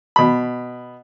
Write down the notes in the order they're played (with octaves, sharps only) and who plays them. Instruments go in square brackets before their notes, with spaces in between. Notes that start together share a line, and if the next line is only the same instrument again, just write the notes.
[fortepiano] B2 B5